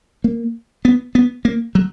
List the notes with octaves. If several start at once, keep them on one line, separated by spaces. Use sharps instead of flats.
A#3
B3
B3
A#3
F#3